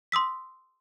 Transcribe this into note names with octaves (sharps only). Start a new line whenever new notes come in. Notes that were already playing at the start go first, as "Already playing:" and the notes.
C6 D#6 E6 B6